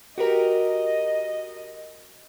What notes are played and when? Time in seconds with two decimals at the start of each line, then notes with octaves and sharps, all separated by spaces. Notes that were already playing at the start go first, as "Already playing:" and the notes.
0.18 F#4 G4 A#4 D#5